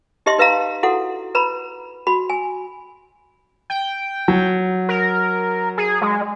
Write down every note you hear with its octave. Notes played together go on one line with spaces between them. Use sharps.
D#4 G4 D#5 E5 C6
D#4 B4 E5 F5 A#5
E4 F#4 A4 F#5
B4 A#5 B5
F#4 B5
G#5
G5
F#3
A#4
G#4
G#3